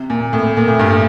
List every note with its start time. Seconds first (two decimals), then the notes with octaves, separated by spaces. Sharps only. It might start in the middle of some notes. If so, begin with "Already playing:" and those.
Already playing: C3
0.10 A#2
0.33 A2
0.57 A#2
0.68 A2
0.79 G2
0.91 A2